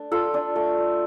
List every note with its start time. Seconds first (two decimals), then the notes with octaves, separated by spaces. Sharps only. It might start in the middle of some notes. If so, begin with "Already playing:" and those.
Already playing: A3 D4
0.12 F4 A4
0.34 D4
0.56 A3
0.78 A3